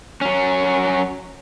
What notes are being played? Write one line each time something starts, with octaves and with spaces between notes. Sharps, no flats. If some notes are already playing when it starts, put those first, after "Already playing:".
F#3 C#4